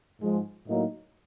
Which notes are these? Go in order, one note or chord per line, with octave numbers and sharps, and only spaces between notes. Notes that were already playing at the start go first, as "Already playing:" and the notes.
G#2 F3 G#3
A2 F#3 A#3 D#4